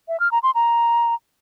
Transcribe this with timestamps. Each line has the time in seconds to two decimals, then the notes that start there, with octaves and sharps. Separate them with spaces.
0.08 E5
0.20 F6
0.32 A#5
0.43 C6
0.55 A#5